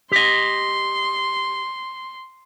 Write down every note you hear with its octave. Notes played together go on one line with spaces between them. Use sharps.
G4 D#5 C6